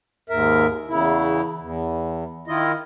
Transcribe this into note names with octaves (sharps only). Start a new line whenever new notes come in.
D#2 G#2 A#4 E5
E2 C#3 E4
E2
D#3 E4 F4 D#5